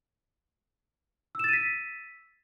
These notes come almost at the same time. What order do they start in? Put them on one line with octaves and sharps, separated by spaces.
E6 E7 A6 D#7 B6